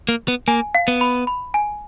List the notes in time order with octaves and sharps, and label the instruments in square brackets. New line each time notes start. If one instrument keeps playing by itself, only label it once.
[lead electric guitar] A#3
B3
[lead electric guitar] A#3 [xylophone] G#5
[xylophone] F5
[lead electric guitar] B3
[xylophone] B5
B5
G#5